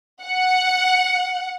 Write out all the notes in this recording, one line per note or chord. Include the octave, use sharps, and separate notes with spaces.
F#5